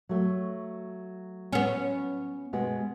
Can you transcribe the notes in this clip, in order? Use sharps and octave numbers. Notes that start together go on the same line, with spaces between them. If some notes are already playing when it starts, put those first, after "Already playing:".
F#3 A3
B3 C#4
B2 G#3 B3